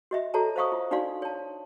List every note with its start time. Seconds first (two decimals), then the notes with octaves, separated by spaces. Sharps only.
0.11 F#4 D#5 E5
0.34 F#4 A4 C#5 A5 A#5
0.56 C5 D#5 F5 C#6 D#6
0.72 F4
0.91 D4 D#4 F#4 D5 F5 C6
1.22 C#5 A5